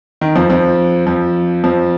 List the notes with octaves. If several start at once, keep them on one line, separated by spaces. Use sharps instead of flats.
D#3
F2 F3
F2 F3
F2 F3
F2 F3